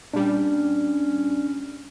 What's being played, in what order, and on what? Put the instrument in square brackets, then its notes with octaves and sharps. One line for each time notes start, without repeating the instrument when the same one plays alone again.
[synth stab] A#2 G3 [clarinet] C#4 [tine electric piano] D4